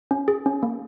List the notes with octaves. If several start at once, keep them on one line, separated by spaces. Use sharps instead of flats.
C#4
G#4
C#4
A#3